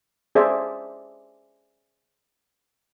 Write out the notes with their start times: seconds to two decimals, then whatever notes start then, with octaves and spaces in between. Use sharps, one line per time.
0.35 G#4 C5 D5 E5